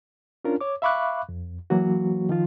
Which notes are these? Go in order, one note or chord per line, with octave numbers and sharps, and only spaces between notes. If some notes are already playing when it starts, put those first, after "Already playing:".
C#4 D4 F4 A#4
C#5 D6
E5 F5 B5 C#6 D6 F#6
F2
E3 F#3 A#3 F#4
D#3 F3 F4